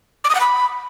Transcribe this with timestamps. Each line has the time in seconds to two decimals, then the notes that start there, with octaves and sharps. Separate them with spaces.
0.24 D6
0.30 D#6
0.35 F#5
0.40 B5